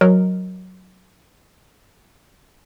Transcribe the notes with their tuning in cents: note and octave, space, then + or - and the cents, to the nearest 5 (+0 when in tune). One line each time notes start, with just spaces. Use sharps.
F#3 +0 A#4 +0 D#5 +0